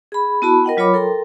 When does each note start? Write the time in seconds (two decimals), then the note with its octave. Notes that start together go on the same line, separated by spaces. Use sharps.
0.12 G#4 B5
0.42 B3 E4 F#4 A5 B5
0.64 A#4 D#5 F#5 G5
0.77 F#3 F4 C#5 B5 D6
0.94 A4 A#4 G5 A#5 C6